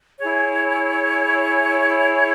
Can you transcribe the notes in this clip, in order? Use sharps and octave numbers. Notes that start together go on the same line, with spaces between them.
E4 G#4 C#5